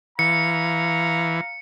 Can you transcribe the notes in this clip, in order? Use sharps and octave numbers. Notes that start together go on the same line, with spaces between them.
E3 F5 A#5 C#7